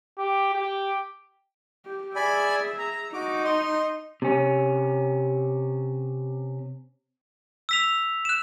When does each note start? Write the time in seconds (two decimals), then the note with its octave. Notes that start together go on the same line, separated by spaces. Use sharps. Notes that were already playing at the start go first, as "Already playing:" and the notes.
0.18 G4
0.53 G4
1.85 G4
2.16 G#4 D5 E5 G#5 B5
2.78 A#5
3.14 D#4 F#4 D6
3.45 D#5 C6
4.22 C3 C#4
7.69 E6 B6 F7
8.25 F#6 E7